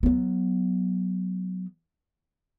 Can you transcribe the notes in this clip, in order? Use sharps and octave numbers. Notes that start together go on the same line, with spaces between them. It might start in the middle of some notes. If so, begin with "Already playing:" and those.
F#3 B3